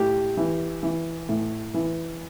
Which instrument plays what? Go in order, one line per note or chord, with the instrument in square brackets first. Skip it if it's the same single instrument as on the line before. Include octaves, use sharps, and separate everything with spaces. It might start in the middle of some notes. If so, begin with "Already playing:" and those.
Already playing: [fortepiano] A2 G4
E3
E3
A2
E3